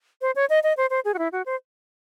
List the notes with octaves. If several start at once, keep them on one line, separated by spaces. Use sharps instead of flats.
C5
C#5
D#5
D#5
C5
C5
G#4
F#4
E4
F#4
C5